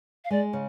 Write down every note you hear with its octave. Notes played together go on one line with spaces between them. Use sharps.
F5
G#3 D5
C#3